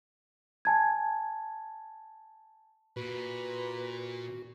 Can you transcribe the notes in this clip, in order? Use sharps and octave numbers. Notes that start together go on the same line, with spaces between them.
G#5 A5 G#6
A#2 F#4 B4